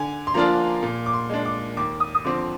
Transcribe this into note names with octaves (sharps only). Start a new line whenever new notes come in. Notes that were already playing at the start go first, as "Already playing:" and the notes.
Already playing: D3 G#5
C6
F3 A#3 D4 F4 A#5
A#2
D6
C6
G#3 D4
D6
D#2 D6
D#6
D#6
D3 F3 C4 D6